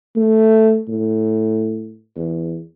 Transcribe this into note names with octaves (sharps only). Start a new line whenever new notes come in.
A3
A2
E2